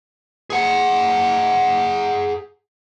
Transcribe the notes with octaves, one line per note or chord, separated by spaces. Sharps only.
G#4 F#5